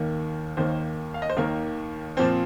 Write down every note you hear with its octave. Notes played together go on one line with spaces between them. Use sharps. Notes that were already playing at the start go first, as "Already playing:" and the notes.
Already playing: D#2 D#3 A#3
D#2 D#3 A#3 C5
F5
D#5
C5
D#2 D#3 A#3 A#4
A#2 F3 C4 C5